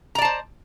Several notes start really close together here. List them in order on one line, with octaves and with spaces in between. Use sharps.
A#5 D5 A5 C5